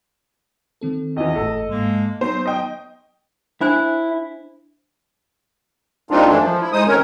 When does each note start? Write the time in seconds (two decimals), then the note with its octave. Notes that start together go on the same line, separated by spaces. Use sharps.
0.81 D#3 C4 A4
1.16 E2 E3 D#5
1.36 G1 A2 A4
1.69 G#2 G#3 A#3
2.21 F#3 B3 D#4 C5 C#6
2.46 D#5 G5
3.61 D4 E4 C5 G#5
6.11 G3 A#3 C4 D4 D#4 F4
6.27 F#2 E3 A3 D4
6.42 F3
6.61 E4
6.73 G#3 D#4 C5 D#6
6.87 D#3 A3 C4 C#4 A#4 C#5